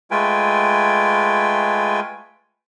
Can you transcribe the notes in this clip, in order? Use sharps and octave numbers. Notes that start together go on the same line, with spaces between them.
G#3 A3 F4 B4 G5 G#5